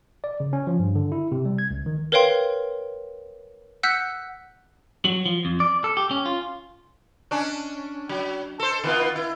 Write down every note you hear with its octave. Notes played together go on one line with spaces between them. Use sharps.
D5
C#3
C#4
F3
G2
D3
E4
C3
G3
G#6
C#2
D#3
A#4 B4 C#5 F5 G5 C6
F#5 E6 F#6 G6 B6 C#7
F#3
F3
F2
D5
A4
G4
C#4
F4
C#4 D4
F#3
A4 C5
D#3 B3 F4
E4